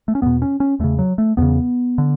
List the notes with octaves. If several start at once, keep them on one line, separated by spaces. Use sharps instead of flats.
A3
C#4
E2 B2 B3
C#4
C#4
E2 C#3 A3
F#3
A3
E2 C#3 B3
D3